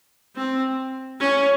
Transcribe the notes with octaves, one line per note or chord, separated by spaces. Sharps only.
C4
C#4